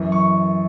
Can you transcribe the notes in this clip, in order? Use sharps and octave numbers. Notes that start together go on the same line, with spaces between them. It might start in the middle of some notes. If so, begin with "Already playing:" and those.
Already playing: F#2 E3
C#6